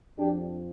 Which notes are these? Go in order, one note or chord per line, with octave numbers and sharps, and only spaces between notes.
F2 F3 D4 G4